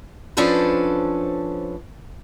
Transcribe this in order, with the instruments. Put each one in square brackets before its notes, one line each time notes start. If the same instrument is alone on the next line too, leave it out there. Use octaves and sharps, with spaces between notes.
[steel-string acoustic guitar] F3 C#4 D4 A4 B4 C5